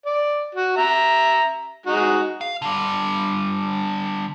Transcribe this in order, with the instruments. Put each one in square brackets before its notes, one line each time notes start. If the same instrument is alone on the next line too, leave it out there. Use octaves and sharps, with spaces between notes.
[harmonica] D5
F#4
E5 A#5
G#3 D#4 F#4
[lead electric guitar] F5
D3 G3